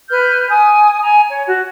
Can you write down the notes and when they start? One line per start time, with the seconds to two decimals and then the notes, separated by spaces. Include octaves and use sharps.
0.10 B4 F6 G6
0.49 G#5 D#6
1.01 G#5 A#5
1.30 C#5
1.47 F#4